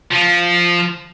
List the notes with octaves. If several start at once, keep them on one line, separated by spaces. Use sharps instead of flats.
F3